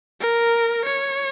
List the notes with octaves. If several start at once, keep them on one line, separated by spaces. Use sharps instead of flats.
A#4
C#5